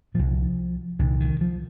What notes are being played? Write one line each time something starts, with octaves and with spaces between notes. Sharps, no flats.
C2 A#2 F3
C2 A#2 D#3
D#3
F3